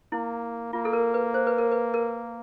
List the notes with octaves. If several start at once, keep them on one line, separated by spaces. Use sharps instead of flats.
A#3 E4
A#3 F4
A4
A#4
B4
C5
B4
A#4
B4
A#4